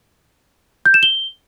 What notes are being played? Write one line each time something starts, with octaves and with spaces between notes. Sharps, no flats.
G6
E7
G7